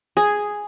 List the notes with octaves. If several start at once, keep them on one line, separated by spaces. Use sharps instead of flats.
G#4